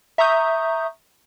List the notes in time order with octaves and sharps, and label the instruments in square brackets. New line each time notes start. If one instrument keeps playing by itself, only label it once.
[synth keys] E5 A#5 C#6 D#6 G6